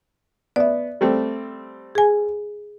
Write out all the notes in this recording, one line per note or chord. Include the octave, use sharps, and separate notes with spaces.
B3 D5 E5
G3 A3 C4
G#4 G#5